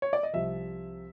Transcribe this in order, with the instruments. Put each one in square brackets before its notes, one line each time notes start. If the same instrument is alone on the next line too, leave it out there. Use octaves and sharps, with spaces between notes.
[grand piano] C#5
D5
D#5
C2 C3 F3 E5